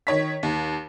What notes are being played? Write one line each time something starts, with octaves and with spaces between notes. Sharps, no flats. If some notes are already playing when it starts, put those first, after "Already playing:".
D#3 C#5 B6
D#2